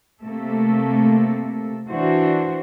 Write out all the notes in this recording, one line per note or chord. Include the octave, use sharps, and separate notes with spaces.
C3 A3 A#3 A4
E3 D4 F#4 C5